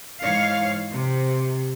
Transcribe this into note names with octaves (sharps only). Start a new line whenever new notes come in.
G#2 E3 C#5 F5
C3